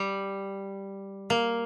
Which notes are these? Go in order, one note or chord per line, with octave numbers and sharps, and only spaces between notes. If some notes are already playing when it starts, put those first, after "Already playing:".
Already playing: G3
A#3